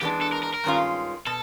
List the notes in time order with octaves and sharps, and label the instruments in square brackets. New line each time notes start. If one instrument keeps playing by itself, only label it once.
[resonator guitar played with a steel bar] E3 G#3 B3 D4 [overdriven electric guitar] G4
[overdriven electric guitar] A4
A#4
A#4
A#4
[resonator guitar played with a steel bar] G2 D#3 G#3 C#4 F4
[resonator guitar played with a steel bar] B2 [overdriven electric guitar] A4